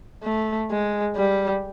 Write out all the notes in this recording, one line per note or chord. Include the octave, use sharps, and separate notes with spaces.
A3
G#3
G3